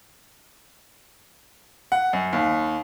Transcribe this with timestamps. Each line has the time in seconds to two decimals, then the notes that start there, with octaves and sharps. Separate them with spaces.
1.92 F#5
2.13 F#2
2.33 D#2